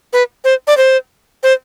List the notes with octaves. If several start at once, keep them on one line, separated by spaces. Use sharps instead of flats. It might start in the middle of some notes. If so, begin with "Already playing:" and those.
B4
C5
D5
C5
C5